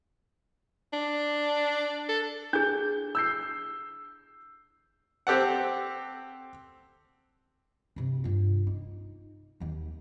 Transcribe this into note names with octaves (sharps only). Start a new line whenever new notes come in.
D4
A4
D4 G#4 G6
E6 G6 C7
C4 G4 A4 F#5
G2 C3
G2 F4
D#4
D#2 D#3